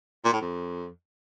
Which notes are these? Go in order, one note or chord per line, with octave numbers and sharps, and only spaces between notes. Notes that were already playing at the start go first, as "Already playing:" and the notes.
A#2
A2
F2